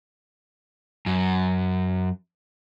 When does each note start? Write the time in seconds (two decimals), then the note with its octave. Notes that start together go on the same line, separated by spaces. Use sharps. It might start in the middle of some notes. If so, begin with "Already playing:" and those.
1.06 F#2